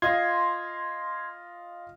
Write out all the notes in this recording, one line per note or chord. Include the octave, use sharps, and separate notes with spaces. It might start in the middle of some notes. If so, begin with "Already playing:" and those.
F4 D#5 C6 G#6